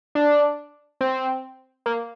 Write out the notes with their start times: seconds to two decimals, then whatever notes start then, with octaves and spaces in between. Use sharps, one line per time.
0.15 D4
1.01 C4
1.86 A#3